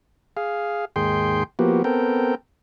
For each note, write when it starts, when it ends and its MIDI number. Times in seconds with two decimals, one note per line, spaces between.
0.37 0.85 68
0.37 0.85 77
0.96 1.43 39
0.96 1.43 44
0.96 1.43 68
0.96 1.43 79
0.96 1.43 84
1.59 1.83 53
1.59 1.83 58
1.59 1.83 59
1.59 1.83 66
1.59 1.83 67
1.84 2.35 59
1.84 2.35 60
1.84 2.35 69
1.84 2.35 70
1.84 2.35 79